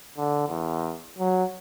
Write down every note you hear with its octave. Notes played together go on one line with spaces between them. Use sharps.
D3
E2
F#3